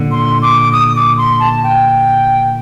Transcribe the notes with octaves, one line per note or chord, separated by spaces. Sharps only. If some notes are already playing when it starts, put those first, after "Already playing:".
Already playing: A#2 D3
C6
D6
D#6
D6
C6
A5
G5